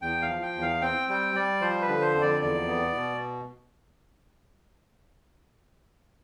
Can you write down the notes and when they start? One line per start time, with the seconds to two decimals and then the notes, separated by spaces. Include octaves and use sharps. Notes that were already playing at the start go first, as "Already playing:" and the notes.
0.02 E2 G5
0.22 F5
0.29 F3
0.42 G5
0.55 E2
0.62 F5
0.82 C4 G5
1.09 G3 G5
1.34 G3 D5
1.61 F3 C5
1.82 B4
1.88 D3
2.01 C5
2.15 F2
2.21 D5
2.41 E2 D5
2.67 B3
2.95 B2